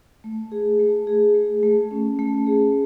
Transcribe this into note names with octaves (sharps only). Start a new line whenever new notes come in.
A3
G#4
A3
G#4
A3
A3
C#4
A3
G#4